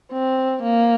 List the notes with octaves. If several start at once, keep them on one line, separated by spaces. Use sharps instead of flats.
C4
A#3